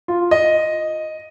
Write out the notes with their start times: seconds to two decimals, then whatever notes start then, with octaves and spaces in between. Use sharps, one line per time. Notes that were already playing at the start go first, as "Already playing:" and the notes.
0.08 F4
0.31 D#5